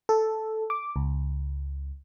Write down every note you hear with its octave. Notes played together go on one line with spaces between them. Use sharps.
A4
D6
C#2